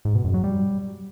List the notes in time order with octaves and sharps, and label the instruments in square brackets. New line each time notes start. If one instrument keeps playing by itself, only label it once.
[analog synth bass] G#2
B2
F#2
F#3
G3